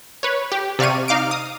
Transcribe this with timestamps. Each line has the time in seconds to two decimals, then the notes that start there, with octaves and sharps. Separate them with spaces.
0.23 B4 C#5
0.52 G4
0.79 C3 D5 F5 C#6 D#7
1.08 D#4 F5 D6 D7
1.31 D#6